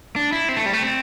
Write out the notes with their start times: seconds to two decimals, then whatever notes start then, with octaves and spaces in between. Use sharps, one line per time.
0.16 D4
0.32 E4
0.49 C4
0.57 A3
0.66 G3
0.73 A3
0.81 C4